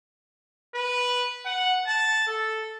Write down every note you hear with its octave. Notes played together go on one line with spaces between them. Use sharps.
B4
F#5
A5
A4